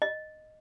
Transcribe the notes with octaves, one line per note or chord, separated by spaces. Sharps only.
D#5